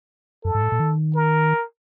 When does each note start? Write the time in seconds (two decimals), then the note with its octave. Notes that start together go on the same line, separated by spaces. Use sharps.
0.45 F#2 A4
0.55 G#2
0.62 A2
0.72 A#2
0.80 D#3
1.15 A#4